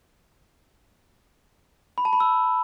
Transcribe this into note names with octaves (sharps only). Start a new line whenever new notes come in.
B5
A5
B5
E6